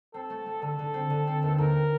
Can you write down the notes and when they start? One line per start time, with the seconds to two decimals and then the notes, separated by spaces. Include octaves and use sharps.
0.14 C4 A4
0.30 A3
0.46 A3
0.62 D3 A4
0.79 D3
0.94 C4
1.10 D3
1.27 C4
1.43 D#2
1.58 D#2 A#4